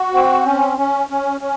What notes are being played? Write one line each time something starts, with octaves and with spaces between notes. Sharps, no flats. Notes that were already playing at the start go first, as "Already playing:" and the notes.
Already playing: F#4
C4
C#4
C#4
C#4
C#4